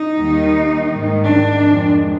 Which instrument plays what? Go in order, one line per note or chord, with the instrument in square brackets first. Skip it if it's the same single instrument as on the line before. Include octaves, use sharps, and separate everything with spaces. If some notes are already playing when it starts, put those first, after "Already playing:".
Already playing: [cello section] D#4
D#2 D#3 G3
G#2 D#3 G#3
D4
F2 D#3 G#3